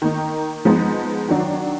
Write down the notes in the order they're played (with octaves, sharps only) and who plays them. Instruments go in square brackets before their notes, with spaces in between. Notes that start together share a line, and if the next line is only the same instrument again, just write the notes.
[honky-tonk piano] D#3 A#3 D#4
F3 G#3 B3 D#4
D#3 F#3 D4 F#4